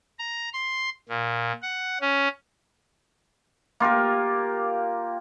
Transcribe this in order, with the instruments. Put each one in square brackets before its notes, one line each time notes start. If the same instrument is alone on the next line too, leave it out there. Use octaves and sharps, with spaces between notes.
[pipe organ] A#5
C6
A#2
F#5
C#4
[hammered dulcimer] A#3 F4 G4 A#4